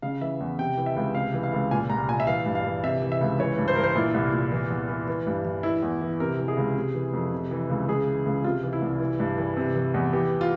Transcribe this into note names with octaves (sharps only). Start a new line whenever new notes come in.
C#3 F5
E3 E5
E2
C3 G5
E3
E5
C#2
C3 F5
E3
F5
C#2
A#2 G#5
C2 A#5
A#2 G#5
E5
E3 F5
G2
F5
E3
C3 E5
E3
E5
C#2
E3 C#5
G2
C5
E3 A#4
C5
A#2 E4
C2
A#2
E3
E2
E3
E3
G2
E3
E3 E4
E2
E3
C3 A#4
E3
G#4
C#2
C3
E3
F2
C3
E3
C#2
C#3 G#4
E3
C#2
C3 F4
E3
E4
C2
E3
G2
E3
C3
E3
E2
E3 G4
F4